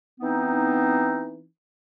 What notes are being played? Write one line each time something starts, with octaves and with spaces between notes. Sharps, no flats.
E3 B3 C4 D#4